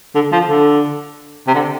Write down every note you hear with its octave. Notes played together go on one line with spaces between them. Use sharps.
D3
F3
D3
C3
D3